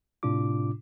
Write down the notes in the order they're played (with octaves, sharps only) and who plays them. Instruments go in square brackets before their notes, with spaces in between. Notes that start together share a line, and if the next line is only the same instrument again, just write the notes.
[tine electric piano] A2 C3 D4 F4 D6